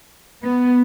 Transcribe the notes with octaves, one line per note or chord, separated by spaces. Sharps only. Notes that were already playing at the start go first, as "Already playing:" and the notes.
B3